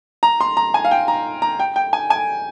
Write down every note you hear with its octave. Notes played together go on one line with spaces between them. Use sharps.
A#5
C6
A#5
G#5
F5
G5
A#5
A#5
G5
G5
G#5
G#5